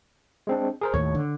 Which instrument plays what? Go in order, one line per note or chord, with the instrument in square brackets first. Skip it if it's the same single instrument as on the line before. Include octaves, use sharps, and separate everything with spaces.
[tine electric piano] G#3 C4 D4
G#4 A#4 C5
[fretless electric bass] D#2 A2 [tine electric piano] C#5
[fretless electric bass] D3